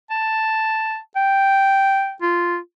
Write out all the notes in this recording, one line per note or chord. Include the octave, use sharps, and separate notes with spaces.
A5
G5
F4